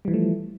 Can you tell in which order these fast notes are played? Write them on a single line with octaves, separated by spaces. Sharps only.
G3 E3 F3 A3